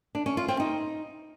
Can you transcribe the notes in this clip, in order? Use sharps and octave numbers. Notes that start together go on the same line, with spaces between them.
D4
C#4
F4
C4
D#4